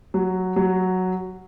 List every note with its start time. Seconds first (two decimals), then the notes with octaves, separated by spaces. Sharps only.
0.14 F#3
0.56 F#3